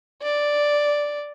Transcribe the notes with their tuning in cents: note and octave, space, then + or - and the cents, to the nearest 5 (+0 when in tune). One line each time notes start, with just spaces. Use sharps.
D5 +0